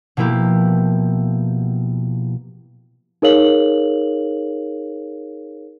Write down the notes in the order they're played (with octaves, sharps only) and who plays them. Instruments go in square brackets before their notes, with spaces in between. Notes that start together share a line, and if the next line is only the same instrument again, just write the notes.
[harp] B2 F3 A#3 E4 G4
[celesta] D#4 G#4 A#4 C#5 F5 F#7